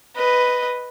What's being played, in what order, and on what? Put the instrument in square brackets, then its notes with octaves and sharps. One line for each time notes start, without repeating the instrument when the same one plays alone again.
[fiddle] B4 D#5